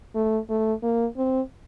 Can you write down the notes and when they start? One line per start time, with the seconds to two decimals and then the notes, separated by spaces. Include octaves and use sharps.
0.15 A3
0.49 A3
0.83 A#3
1.17 C4